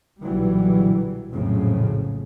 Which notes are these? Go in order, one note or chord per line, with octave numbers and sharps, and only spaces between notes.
B1 A#2 D3 E3 F#3 G3
A#1 F2 A2 C#3 F3 F#3